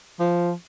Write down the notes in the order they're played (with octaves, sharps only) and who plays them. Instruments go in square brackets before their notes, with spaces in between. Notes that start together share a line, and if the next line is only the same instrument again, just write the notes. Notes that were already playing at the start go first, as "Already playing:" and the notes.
[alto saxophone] F3